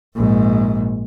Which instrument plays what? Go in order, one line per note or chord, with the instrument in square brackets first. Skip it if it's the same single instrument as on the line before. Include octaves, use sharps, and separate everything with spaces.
[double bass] A#1 G#2